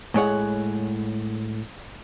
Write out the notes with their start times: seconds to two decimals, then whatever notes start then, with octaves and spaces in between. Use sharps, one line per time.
0.14 A2 G#3 C#5 F#5